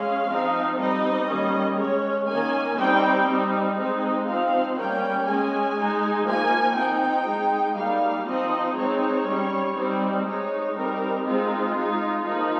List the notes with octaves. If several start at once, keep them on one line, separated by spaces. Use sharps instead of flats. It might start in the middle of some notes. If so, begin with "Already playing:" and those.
Already playing: G#3 C#4 F5
F3 C4 D#4
G3 C4 D#4 D#5
D#3 G3 A#3 C#4
G#3 C#4 C#5
D#3 A#3 C#4 G#5
G3 C4 D#4 G5
G3 C4 D#4
G#3 C4 D#4
F3 C4 D#4 F5
G3 A#3 C#4 G5
G#3 C#4 G#5
G#3 D#4
F3 A#3 D#4 G#5
F3 C4 D#4 G5
G#3 D#4
G3 A#3 D#4 F5
F3 C4 D#4 D#5
G#3 C4 D#4 C#5
G3 C#4
G3 C4 D#4
G#3 D#4 C#5
G3 C4 D#4 A#4
G#3 C4 D#4 F4
G#3 D#4
F3 A#3 D#4